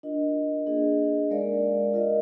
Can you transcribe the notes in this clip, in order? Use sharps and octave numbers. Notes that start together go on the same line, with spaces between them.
D4 F4 A#4 D#5
A#3 D4 G#4 D#5
G#3 D#4 A#4 D5 F5
F4 A#4 D#5